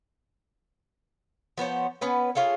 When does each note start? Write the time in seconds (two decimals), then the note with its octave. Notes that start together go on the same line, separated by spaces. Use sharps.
1.58 F3 B3 C5 C#5
2.01 B3 C#4 B4
2.35 C#4 F4 G#4 A4